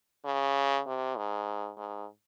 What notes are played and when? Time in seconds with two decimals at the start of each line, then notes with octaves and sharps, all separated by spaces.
0.25 C#3
0.87 C3
1.17 G#2
1.78 G#2